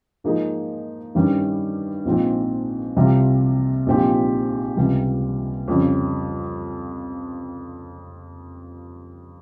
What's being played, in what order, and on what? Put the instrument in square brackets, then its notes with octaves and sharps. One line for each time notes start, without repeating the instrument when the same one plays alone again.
[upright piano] G#2 F3 A#3 D#4 G#4
G2 D#3 G3 C#4
A#1 G#2 F3 C4
C2 C3 G3 C4 F4
A#1 G#2 F3 C4 G4
C#2 C3 G3
F2 C#3 G3 C#4